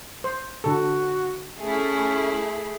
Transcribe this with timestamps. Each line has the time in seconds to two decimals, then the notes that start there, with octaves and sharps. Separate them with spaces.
0.24 C5
0.64 D3 F#4 A4
1.60 A3 C#4 E4 G#4